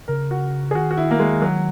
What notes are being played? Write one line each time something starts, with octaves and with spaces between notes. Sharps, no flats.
C#3 A#4
F#4
G#4
D#3 F#4
F#4
E4
A#3
G#3
F#3